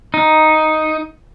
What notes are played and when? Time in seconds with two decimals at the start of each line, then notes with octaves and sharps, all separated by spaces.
0.14 D#4